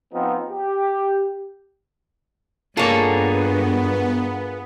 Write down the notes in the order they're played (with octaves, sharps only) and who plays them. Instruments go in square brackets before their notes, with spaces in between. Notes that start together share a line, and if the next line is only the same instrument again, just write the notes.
[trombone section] F3 B3 C4 D#4
G4
[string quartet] G2 [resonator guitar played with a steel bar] A#3 A4 [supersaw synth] B3 [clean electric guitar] F4 G#4 C#5